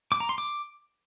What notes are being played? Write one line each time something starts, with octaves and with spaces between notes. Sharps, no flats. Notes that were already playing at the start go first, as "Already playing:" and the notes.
D6
A#5
C6
D6